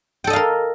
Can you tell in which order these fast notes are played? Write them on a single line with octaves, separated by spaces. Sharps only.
G5 A4 D#5 F5 A#4